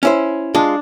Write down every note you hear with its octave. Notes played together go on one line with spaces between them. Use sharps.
C#4 E4 C5
G#3 D4 F4